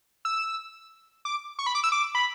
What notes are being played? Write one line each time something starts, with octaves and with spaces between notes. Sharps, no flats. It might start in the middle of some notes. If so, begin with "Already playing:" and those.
E6
D6
C#6
B5
D6
E6
D6
B5